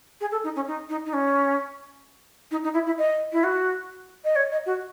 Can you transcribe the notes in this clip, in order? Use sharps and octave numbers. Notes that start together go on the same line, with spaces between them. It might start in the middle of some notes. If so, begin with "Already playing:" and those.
G#4
A4
D#4
C#4
D#4
D#4
D#4
C#4
D#4
D#4
E4
E4
D#5
E4
F#4
D#5
C#5
D#5
F#4